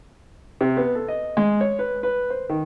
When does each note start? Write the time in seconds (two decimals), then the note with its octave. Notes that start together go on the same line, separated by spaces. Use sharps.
0.61 C3
0.77 B3
0.95 A4
1.08 D#5
1.37 G#3
1.61 C#5
1.79 B4
2.03 B4
2.30 C5
2.49 D#3